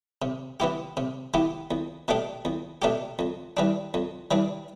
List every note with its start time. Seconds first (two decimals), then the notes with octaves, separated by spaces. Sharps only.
0.22 C3
0.60 E3 B3 E4 G4
0.97 C3
1.34 E3 B3 E4 G4
1.71 E2
2.08 B2 A3 D4 G4
2.45 E2
2.82 B2 A3 D4 G4
3.19 F2
3.57 E3 G3 D4
3.94 F2
4.31 E3 G3 D4